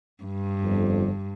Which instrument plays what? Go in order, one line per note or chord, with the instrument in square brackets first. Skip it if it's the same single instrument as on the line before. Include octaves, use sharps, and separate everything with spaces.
[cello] G2
[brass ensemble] G1 F2